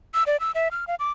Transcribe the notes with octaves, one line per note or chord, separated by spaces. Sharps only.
E6
D5
E6
E5
F6
F5
D6